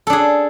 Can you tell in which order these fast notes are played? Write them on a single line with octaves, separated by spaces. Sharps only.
A4 D4 G#4